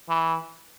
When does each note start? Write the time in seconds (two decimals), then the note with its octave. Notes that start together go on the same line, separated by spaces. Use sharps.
0.09 E3